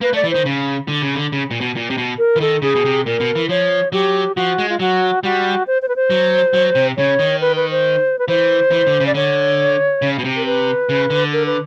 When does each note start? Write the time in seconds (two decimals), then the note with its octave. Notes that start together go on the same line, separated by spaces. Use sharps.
0.01 A#3 B4
0.13 A3
0.16 D5
0.24 E3
0.31 D#3 C5
0.46 C#3
0.88 D3
1.02 C#3
1.14 D3
1.32 C#3
1.51 A#2
1.61 B2
1.76 A#2
1.90 C3
1.98 B2
2.18 A#4
2.36 E3
2.41 D#3 A4
2.62 C#3 G#4
2.75 B2
2.85 C3
3.06 A#2 A#4
3.20 B2
3.35 E3
3.49 F3 C#5
3.92 F#3 G4
4.36 F3 F#4
4.58 G#3
4.69 F4
4.79 F#3 F#4
5.23 G3 F#4
5.67 C5
5.82 C5
5.88 B4
5.96 C5
6.10 F#3
6.54 F#3
6.75 C3
6.97 C#3 C#5
7.19 D#3
7.41 B4
7.56 B4
7.71 C5
8.19 B4
8.28 E3 C5
8.71 E3
8.87 D3
9.00 C#3
9.07 D5
9.15 D3 C#5
10.02 C#3
10.18 B2
10.24 C3
10.36 A#4
10.46 B4
10.89 C#3
11.10 D3
11.33 A#4
11.46 B4